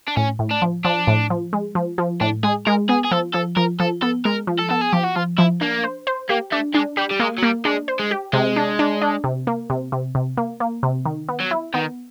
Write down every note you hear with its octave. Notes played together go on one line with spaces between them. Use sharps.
D4
A2 C#4
A2
D4
F3
F3 D4
A2
F3
G#3
F3
F3
A2 D4
G#3 G#4
G#3 A#4
B3 G#4
G#4
F3 A4
F3 A4
F3 A#4
F3 A4
B3 A4
G#3 A#4
F3
A4
B3 A4
G#4
F3 G4
F#4
F3 F4
F3 E4
A#3 D4
C5
C5
A#3 G4
A3 D4
G#3 D4
G3 G4
G3
G#3 A#3
F#3
G3 A#3
G#3 D4
C5
G#3
G4
C3 G#3
D4
D4
D4
C3
A#3
C3
C3
C3
A#3
A#3
C3
D#3
B3
F#3
E4
D#3 B3